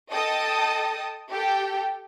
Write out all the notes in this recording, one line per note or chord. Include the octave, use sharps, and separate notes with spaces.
A4 D#5 G5 A5 D#6
G4 A4 G5